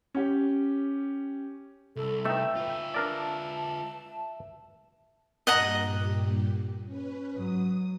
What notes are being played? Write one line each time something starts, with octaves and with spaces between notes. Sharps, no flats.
C#4 G4
C2 A4
A3 D#4 E5 G5
F4 B4
D4 A#4 D5 A5
G2 A#2 G4 D#5 F#5 A#5
C#4 B4
G#2 F#3 D#6